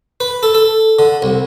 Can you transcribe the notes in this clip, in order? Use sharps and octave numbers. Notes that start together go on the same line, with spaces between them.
B4
A4
A4
D3
C2